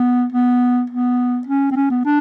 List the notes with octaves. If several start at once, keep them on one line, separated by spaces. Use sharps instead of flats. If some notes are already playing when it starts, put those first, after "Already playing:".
Already playing: B3
B3
B3
C#4
C4
C#4
B3
D4